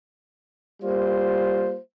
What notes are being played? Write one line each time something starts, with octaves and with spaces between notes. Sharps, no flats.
G3 A#3 F4 C5